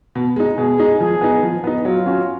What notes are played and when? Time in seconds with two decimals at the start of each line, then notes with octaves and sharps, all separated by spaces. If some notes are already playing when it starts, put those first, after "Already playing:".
0.15 B2
0.36 G#3 D#4
0.57 B2 G#4
0.78 G#3 D#4
1.00 F3 G#4
1.21 B3 D#4
1.43 F3
1.64 B3 D#4
1.85 F#3 F4
2.06 C#4 F#4